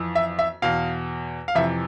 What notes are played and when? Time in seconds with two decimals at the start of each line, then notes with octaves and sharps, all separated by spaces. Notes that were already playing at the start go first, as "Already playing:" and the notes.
Already playing: F2 E3
0.15 E5
0.39 E5
0.62 E2 B2 F5
1.48 F5
1.55 F2 C3 E3 E5